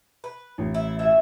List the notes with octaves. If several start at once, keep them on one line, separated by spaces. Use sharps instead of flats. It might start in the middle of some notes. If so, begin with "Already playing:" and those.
B4
A1
E4
B2 E4 E5